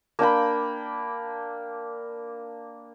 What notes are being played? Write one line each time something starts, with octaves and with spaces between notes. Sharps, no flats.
A#3 D4 G5 B5